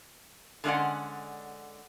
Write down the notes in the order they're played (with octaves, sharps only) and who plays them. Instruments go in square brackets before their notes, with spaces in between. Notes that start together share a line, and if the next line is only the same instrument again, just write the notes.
[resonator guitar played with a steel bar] D3 G#3 A3 C#4 D5 F#5